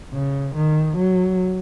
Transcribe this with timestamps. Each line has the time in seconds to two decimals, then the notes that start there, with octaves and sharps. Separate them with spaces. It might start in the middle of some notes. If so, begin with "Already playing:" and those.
0.13 C#3
0.56 D#3
0.98 F#3